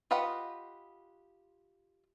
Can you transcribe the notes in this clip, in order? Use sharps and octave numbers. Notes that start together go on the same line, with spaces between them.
F4 G4 B4 D#5 F#5